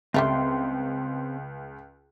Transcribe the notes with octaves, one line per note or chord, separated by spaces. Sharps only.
C#2 G3 A3 C4 F4 C6